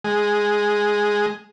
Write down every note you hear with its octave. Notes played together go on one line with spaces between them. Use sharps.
G#3